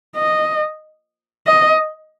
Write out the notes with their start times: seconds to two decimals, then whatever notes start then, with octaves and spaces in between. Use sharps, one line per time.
0.16 D#5
1.47 D#5